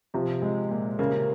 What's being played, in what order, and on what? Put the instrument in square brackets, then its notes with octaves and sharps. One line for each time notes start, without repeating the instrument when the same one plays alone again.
[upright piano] C3 [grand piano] F3
[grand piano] G#3
A#2
[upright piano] C#3 [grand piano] A#3